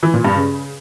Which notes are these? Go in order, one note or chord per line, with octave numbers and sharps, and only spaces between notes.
E3
A#2
G2
C#3